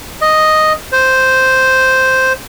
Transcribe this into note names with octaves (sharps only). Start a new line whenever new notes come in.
D#5
C5